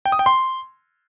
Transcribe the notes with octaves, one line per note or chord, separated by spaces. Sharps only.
G5
D#6
G5
C6